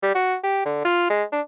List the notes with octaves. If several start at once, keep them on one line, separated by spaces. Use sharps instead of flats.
G3
F#4
G4
D3
F4
G#3
D4